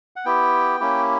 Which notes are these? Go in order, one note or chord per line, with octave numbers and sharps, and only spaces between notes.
F#5
B3 E4 G4 G5
A#3 C#4 E4 G4